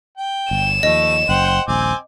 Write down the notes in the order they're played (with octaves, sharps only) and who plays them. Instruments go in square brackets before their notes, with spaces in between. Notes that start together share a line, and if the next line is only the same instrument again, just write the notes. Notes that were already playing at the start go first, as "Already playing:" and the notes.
[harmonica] G5
[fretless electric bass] G1 [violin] E7
[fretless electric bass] D#2 F3 [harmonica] A3 [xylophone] D#5
[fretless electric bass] F#1 F#2 [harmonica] C5 F#5 G5
[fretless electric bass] D#1 A#1 [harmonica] C4 G#5 D6